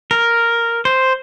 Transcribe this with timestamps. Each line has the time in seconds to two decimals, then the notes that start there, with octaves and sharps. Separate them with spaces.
0.11 A#4
0.85 C5